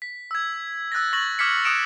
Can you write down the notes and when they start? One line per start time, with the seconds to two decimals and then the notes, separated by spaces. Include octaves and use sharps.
0.02 B6
0.31 E6 G#6
0.92 E6 F#6 A6 A#6
1.13 C#6 A6 A#6 F#7
1.39 D6 F6 G#6 B6 C#7
1.64 D#6 F#6 C#7 D7 E7 F7